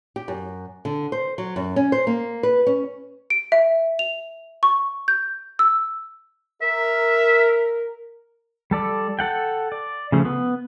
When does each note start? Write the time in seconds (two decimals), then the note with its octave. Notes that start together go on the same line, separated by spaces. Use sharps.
0.16 G4
0.28 F#2
0.85 D3
1.12 C5
1.38 F#3
1.56 F#2
1.76 C#4
1.92 C5
2.07 A#3
2.43 B4
2.66 C#4
3.30 D7
3.52 E5
3.99 F7
4.63 C#6
5.08 G6
5.59 E6
6.62 A#4 E5
8.71 G3 A4 D5
9.19 A4 F#5 G5
9.72 D5
10.12 C#3 F3 A3
10.25 B3